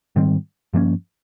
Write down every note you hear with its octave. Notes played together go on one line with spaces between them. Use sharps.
G#2 D#3 G3 C4
G2 F3 A#3 C#4